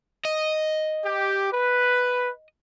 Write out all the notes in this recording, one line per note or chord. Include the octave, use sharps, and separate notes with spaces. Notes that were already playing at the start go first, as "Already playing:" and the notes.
D#5
G4
B4